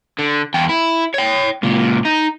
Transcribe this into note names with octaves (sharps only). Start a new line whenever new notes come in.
D3
E2 G5
E4
C#5 G5
C#2 A#2
D#4